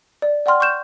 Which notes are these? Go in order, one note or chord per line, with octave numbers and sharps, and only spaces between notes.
D5
D5 F#5 G5 C6 F6
C#6 F6 G6 E7